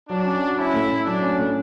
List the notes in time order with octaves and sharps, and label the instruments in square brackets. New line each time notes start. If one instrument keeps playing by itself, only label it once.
[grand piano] F#3 [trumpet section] D4
[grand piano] C#4
F#4
[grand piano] C#4 [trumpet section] E4
[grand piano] A2
A2
[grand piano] F#3 [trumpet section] D4
[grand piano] C#4
A2